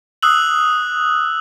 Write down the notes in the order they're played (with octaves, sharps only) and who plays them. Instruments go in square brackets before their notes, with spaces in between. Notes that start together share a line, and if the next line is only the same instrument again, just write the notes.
[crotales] D#6 E6 F#6 F#7